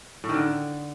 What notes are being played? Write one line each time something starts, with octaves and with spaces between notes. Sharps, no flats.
A2
D#3
D3